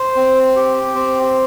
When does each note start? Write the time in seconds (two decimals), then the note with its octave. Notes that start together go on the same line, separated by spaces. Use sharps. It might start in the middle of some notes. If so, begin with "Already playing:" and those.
Already playing: C5
0.16 C4
0.56 G4
0.95 C4